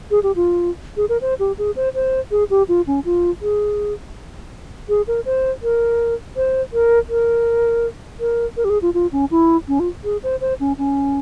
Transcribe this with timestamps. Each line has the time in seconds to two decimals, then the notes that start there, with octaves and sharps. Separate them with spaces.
0.11 G#4
0.23 G4
0.36 F4
0.97 G#4
1.09 A#4
1.21 C5
1.39 G4
1.58 G#4
1.76 C5
1.95 C5
2.31 G#4
2.50 G4
2.69 F4
2.87 C#4
3.05 F4
3.42 G#4
4.89 G#4
5.08 A#4
5.25 C5
5.63 A#4
6.37 C5
6.73 A#4
7.09 A#4
8.20 A#4
8.57 A#4
8.65 G4
8.70 G#4
8.82 F4
8.94 F4
9.12 C#4
9.31 E4
9.68 C#4
9.80 F4
10.04 G#4
10.23 C5
10.41 C5
10.60 C#4
10.78 C#4